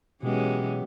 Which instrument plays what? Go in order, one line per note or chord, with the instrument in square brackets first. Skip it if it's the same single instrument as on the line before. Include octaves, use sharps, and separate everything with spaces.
[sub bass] B2 [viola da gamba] E3 G#3 C#4 [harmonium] F#3 B3 G4